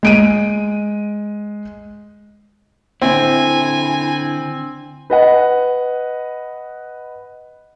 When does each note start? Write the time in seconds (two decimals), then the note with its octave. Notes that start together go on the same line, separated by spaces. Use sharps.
0.03 G#3 D7 D#7
3.02 D3 C4 E4 G#5
5.10 B4 D#5 F#5